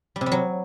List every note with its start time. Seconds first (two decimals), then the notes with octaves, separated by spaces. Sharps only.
0.16 G3
0.21 C3
0.26 G3
0.32 F#3